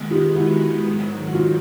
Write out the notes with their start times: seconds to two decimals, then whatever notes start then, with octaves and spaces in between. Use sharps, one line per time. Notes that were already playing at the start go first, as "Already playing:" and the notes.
Already playing: D#3 G#3 B3
0.11 F4 G4
0.36 E4 F#4
0.85 G#2 D#3 F#3
1.27 F#4
1.34 D#4 F4